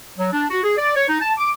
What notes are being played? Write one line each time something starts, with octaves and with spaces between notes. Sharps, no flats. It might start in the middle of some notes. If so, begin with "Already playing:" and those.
F#3
D4
F#4
G#4
D5
C#5
D#4
A5
D6